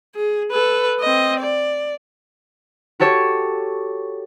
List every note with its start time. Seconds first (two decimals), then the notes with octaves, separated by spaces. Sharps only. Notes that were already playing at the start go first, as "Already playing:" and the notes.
0.15 G#4
0.51 A4 B4
1.00 C4 D#5
1.40 D5
3.00 F#4 G4 A4 C#5